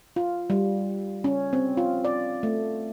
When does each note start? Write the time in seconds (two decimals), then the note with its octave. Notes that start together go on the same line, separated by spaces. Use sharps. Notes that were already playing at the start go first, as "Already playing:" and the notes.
0.16 F4
0.50 G3
1.24 C#4
1.53 C4
1.77 F4
2.04 D5
2.43 A3